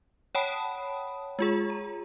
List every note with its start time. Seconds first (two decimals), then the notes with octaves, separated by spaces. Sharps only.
0.35 C#5 F#5 G5 A5 B5 D#6
1.39 G#3 F4 G#4
1.70 A#5